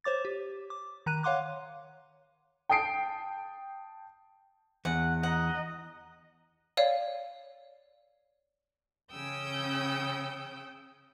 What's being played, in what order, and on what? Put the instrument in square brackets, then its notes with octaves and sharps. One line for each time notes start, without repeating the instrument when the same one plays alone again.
[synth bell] C5 C#5 D6 A6
G4
D6
D#3 A#5 F#6 D#7
C#5 F5 F#5 C6 D6 F#6
[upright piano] G5 A5 D#6 C7 D7
[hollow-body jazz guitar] E2 [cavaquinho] F#5
[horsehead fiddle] D#5 A#5 [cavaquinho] F#5
[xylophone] C#5 D5 F5
[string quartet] C#3 C#4 G5 D#6 E6 G6